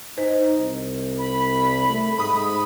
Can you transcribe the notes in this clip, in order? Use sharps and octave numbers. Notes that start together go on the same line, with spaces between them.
D#4 C5
C2
B5
A3
G#2 B5 D#6